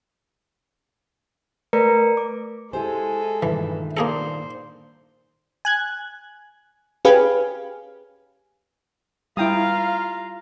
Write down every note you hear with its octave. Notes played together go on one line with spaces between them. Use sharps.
A3 A#4 B4 D5 A#5 C#7
D6
G#3 E4 G4 A4 C5 G#5
G2 A#2 D#3 E3 E5
A#3 G#4 A4 C5 D5
G#5 F#6 G#6
C#4 G4 G#4 B4 F5 G#5
G3 E4 F4 F5 G5 A#5 D#6